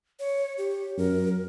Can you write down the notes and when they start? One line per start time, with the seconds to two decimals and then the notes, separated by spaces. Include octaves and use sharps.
0.20 C#5
0.58 G4
0.98 F#2 A#4